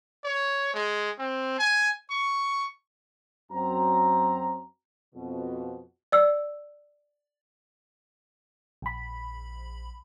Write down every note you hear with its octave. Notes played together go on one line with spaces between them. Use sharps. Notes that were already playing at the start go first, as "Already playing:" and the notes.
C#5
G#3
C4
G#5
C#6
F#2 C4 A#5
F2 B2
D5 E6
A#1 B5